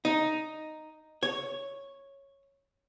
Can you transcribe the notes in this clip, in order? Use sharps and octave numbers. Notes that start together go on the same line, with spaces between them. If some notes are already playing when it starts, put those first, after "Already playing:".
D#4
C#5